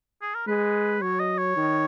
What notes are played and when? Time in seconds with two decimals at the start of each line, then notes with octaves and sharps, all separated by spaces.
0.21 G#4
0.35 A#4
0.47 G#3 B4
1.02 F#3 C#5
1.20 D#5
1.38 C#5
1.57 D#3